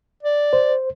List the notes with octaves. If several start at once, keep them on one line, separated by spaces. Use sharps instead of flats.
D5
C5